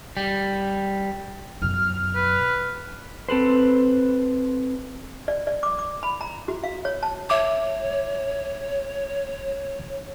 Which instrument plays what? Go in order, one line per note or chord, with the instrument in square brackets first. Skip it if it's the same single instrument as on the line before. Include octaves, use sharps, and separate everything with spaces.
[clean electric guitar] G3
[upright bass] F#2 B2 [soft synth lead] F6
[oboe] B4
[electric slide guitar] C4 A4 B4 C5
[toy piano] D5
D5
D6
D6
B5
A#5
F#4
F5
C#5
A5
[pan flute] C#5 [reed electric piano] E5 D6